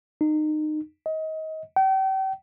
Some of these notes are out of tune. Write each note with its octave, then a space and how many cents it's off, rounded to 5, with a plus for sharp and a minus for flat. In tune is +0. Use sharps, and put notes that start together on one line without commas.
D#4 -25
D#5 +25
G5 -35